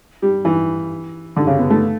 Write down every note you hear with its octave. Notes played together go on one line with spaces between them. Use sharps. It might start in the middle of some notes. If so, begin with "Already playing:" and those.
G3
E3
D3
C#3
B3
A3